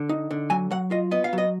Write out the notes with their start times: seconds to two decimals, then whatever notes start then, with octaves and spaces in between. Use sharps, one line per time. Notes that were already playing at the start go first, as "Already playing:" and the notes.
Already playing: D3
0.09 D#4
0.31 D3
0.50 F#3 G#5
0.71 F#3 F#5
0.91 F4 D#5
1.11 B3 D#5
1.24 F5
1.33 F#3
1.38 D#5